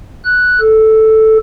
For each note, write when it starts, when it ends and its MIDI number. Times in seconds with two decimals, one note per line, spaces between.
0.24 0.60 90
0.60 1.38 69